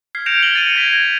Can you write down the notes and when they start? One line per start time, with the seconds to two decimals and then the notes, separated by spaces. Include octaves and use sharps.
0.15 F6 G#6 B6 C7
0.26 G6 A#6 C#7 D7 E7 F7
0.41 G6 G#6 D7 E7 F#7 G7
0.55 A6 C#7 D#7
0.76 G#6 A#6 B6
0.93 G#6 F#7